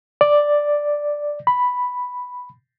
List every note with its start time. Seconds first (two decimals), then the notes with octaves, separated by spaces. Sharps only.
0.21 D5
1.47 B5